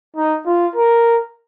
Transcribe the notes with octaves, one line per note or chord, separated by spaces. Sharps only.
D#4
F4
A#4